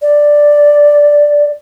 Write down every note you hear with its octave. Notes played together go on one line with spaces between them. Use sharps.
D5